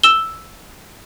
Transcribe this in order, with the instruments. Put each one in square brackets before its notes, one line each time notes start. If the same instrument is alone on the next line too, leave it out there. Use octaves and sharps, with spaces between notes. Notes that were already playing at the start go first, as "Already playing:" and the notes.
[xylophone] E6 E7 G7